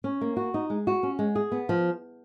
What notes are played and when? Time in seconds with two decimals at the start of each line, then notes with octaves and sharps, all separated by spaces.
0.04 C#4
0.21 A#3
0.37 F#4
0.54 D#4
0.70 G#3
0.87 F#4
1.03 C#4
1.19 G#3
1.35 G#4
1.52 B3
1.69 F3